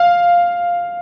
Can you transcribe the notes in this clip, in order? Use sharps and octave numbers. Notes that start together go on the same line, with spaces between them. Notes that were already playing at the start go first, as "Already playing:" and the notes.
Already playing: F5